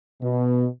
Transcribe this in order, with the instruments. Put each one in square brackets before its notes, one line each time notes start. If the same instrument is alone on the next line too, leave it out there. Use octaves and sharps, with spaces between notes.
[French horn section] B2